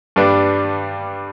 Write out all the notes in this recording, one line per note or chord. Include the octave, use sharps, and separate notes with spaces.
G2 G3 D4 B4 D5